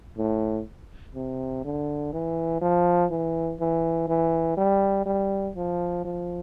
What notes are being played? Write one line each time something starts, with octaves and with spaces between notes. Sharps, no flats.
A2
C3
D3
E3
F3
E3
E3
E3
G3
G3
F3
F3